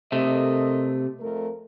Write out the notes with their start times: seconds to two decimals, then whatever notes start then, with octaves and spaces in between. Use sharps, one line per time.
0.12 C3 A3 A4 A#4 D#5
1.20 F2 A3 A#4